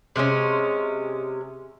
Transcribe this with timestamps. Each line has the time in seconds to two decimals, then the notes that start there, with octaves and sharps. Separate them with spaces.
0.16 C3 G#3 C4 C#4